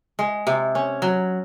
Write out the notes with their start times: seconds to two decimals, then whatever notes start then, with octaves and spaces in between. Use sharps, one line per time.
0.19 G#3
0.47 C3
0.75 C#4
1.02 F#3